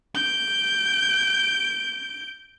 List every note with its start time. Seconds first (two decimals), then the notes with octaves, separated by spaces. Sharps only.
0.15 G6 D7